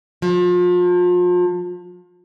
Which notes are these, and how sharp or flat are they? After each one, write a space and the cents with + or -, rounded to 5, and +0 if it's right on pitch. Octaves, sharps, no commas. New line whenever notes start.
F3 +35